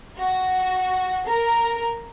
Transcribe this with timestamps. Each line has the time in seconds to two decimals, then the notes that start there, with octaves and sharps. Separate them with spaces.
0.17 F#4
1.27 A#4